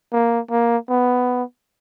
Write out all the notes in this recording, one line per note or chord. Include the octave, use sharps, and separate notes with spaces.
A#3
A#3
B3